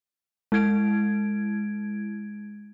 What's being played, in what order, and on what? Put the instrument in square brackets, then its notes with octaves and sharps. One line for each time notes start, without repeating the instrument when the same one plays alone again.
[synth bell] G#3 E4 G#6 D7